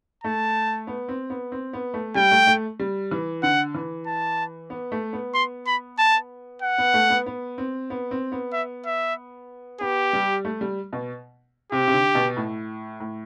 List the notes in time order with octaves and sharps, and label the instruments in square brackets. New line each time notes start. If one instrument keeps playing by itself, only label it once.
[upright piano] A3 [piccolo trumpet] A5
[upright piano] B3
C4
B3
C4
B3
A3
[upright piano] G3 [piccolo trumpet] G5
[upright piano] A3
A3
G3
E3
[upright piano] D3 [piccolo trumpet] F#5
[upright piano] E3
[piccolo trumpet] A5
[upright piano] B3
A3
B3
[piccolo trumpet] C6
B5
A5
F#5
[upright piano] B3
A3
B3
B3
C4
B3
C4
B3
[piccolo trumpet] E5
E5
[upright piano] B3 [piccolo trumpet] G4
[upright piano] G3
A3
G3
B2
[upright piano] C3 [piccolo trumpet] G4
[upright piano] C3
D3
B2
A2
A2